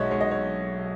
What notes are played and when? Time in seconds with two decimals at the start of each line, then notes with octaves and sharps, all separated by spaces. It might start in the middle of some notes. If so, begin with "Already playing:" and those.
Already playing: B1 G#3 C#5 D#5 E5 F#5
0.11 G#3 C#5
0.21 D#5
0.31 C#5